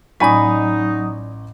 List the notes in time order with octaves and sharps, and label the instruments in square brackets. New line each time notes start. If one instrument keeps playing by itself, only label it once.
[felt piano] A1 C#6 [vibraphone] F#3 D#6 [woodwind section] D#4 [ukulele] D5 G#5 B5